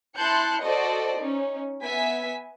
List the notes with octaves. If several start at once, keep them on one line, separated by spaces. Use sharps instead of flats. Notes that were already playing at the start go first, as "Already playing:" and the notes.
E4 A5 C6 F#6 G6 C#7
F#4 A4 C5 D5 D#5
C#4 D#4
B3 E5 G#5 B6